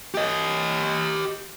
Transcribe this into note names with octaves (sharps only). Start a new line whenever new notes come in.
G4 D#5